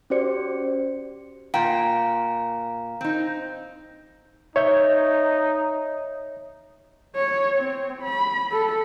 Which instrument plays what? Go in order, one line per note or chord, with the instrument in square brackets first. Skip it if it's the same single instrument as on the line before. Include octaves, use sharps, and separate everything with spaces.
[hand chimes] C#4 F#4 G4 C5 D5 C#7
[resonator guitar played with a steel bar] A#2 G5 [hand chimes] F5 A#5
[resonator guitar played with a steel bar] C4 D#4
[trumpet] D#4 [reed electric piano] C#5 E5 G6
[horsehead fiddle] C#5
C4
B5
A4